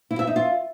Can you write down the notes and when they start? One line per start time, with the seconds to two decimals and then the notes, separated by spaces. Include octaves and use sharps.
0.11 E4
0.19 E5
0.27 D#4
0.36 F4